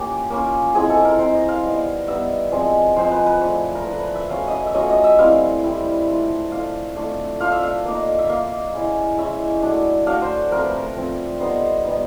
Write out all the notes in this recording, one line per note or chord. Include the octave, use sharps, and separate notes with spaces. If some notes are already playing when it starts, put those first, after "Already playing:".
Already playing: A#3 C#4 F4 G4
A#3 C#4 F4
G#3 C4 E4 G#4
A4
A#4
G#3 C4 E4 C5
D#5
F5
G3 B3 D#4
G3 B3 D#4 E5
F3 G#3 C4
F3 G#3 C4 C5
B4
B4
F3 A3 D4
A#4
F3 A3 D4 B4
B4
E5
F#3 A3 C#4 F4 F5
D#5 E5
E5
F#3 A3 C#4 F4 D#5
D#5
E5
G3 C4 E4 F5
G3 C4 E4
A3 D4 F4
A3 D4 F4 F5
A3 D4 F4
A3 D4 F4 F5
E5
F5
A#3 D#4
E5
A#3 D#4 F5
G#3 C#4 E4
G#3 C#4 E4 E5
F#3 A3 D4
F#3 A3 D4 F5
C5
F3 A3 C4 F4 A#4
B4
A#4
F3 A3 C4 F4
G3 B3 D#4 C5
G3 B3 D#4